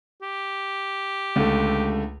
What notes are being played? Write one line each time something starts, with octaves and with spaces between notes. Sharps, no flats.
G4
C#2 D3 A3